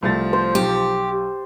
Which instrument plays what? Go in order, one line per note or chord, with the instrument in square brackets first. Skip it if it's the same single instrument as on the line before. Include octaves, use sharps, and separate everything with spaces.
[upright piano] C2 A3 A6 [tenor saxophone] F3
[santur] C5
[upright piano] B1 [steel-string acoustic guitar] G4